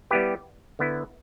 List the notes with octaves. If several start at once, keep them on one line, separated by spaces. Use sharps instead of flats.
G3 B3 E4 G4 B4
D3 B3 E4